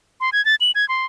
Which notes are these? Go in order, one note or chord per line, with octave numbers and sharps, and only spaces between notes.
C6
G#6
A6
F#7
G#6
C6